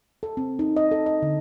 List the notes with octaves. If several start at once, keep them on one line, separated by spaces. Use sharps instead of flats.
A4
C4
D#4
D#5
A4
D#5
D3